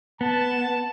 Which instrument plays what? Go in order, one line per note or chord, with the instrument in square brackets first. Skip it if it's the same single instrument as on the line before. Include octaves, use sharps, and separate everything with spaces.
[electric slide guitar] B3 [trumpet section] A5